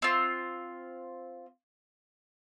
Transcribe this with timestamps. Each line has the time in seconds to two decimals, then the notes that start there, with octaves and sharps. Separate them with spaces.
0.02 C4 F4